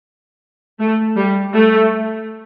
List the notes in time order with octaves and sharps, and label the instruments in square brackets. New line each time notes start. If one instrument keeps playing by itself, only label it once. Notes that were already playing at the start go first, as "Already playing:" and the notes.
[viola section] A3
G3
A3